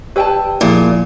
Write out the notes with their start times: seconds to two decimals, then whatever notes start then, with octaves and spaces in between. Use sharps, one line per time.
0.16 G4 B4 D5 G5 A5 E6
0.61 A#2 F3 E4 G#4